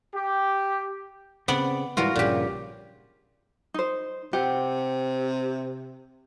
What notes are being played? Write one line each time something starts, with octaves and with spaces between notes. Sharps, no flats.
G4
C#3 B3 C4 D5 F#5
G#2 E3 G3 F4 F#4 A#4
A#1 G2 A#2 C#3 G4
D#4 C5
C3 G4 F#5